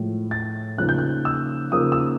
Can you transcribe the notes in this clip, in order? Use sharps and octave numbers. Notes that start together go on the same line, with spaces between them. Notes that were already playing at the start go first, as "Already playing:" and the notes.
Already playing: A2 F3 G#3
A6
C#3 F3 A#3 D#4 F#6
G6
F#6
E6
C#3 F3 A#3 D#4 D#6
E6